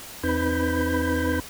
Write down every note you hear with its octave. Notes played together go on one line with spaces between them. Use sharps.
E2 C4 D#4 B4 B5 G6